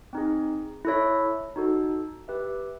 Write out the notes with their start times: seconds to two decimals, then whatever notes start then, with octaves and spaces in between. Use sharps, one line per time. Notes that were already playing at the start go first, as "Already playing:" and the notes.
0.13 C4 D#4 G#4
0.85 E4 A4 C#5 E5
1.56 D#4 F#4 A4
2.28 G4 B4 E5